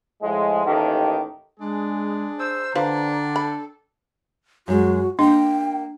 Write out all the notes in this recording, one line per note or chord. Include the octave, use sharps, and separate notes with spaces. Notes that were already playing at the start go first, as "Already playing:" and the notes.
A2 F3 G#3
A1 D#2 D#3 G4 A4
G#3 D4 G#4
C5 E6
D3 D4 F4 B4 C5 G5 A#5
A4 B5
F#2 G#3 F#4
A#3 D4 D#5 G5